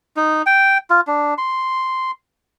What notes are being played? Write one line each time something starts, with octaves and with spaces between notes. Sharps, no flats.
D#4
G5
F4
D4
C6